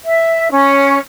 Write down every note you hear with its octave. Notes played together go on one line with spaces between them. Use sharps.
E5
C#4